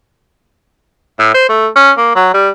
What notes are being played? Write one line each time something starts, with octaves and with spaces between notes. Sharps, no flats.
A2
C5
A3
C#4
A#3
F#3
G3